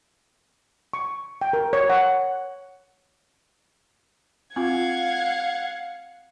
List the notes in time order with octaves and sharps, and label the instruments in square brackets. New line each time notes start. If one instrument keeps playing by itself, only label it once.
[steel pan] C#6
G5
A#4
C#5
F#5
[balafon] C4 F4 [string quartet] F5 F#5 G#6